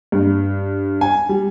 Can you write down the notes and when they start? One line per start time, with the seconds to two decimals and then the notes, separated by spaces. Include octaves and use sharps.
0.12 G2
1.01 G#5
1.29 G3